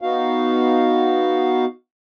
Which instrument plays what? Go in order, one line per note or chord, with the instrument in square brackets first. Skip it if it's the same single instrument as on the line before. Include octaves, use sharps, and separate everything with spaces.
[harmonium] B3 D#4 F#4 F5